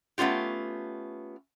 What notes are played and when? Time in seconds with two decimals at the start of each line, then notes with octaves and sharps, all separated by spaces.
0.18 A3 B3 C#4 F4 G4